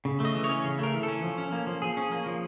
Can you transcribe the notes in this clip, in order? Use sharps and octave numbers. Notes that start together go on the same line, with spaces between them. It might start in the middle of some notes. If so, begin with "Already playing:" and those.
C#3
A3 D#5
E3
C#5
C#4
C#3
A3 A#4
E3
A4
C#4
F3
C#4
A#3
F3
F3 G#4
C#4
A#3
F3